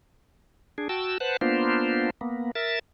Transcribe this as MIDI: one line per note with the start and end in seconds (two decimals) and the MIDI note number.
0.78 0.88 62
0.78 0.88 68
0.89 1.18 66
0.89 1.18 79
0.89 1.18 81
0.89 1.18 88
1.20 1.37 71
1.20 1.37 72
1.20 1.37 78
1.20 1.37 81
1.41 2.10 58
1.41 2.10 59
1.41 2.10 62
1.41 2.10 65
1.41 2.10 72
2.21 2.51 58
2.21 2.51 59
2.55 2.79 70
2.55 2.79 76
2.55 2.79 93